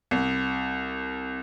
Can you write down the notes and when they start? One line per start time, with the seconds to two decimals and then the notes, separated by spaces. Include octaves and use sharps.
0.11 C2